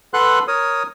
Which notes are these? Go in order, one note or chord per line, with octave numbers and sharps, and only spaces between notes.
A4 B4 F#5 C6 F#6
A#4 C#5 D#6